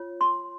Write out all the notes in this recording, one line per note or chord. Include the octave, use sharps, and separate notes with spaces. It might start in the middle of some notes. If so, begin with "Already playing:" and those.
Already playing: F4 C#5
C6